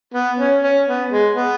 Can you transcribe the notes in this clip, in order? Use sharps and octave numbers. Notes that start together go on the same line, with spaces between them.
B3
C#4
C#4
B3
G#3
B3